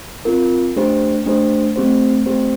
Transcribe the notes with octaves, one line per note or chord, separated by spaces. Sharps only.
C4 F4 A#4
A3 D4 G4 C5
A3 D4 G4 C5
A3 C4 G4 C5
A3 C4 G4 C5